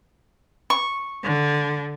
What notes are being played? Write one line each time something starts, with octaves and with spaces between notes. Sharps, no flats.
C#6
D3